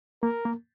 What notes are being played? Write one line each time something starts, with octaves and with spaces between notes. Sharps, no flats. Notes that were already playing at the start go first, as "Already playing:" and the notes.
A#3 A#4
A#3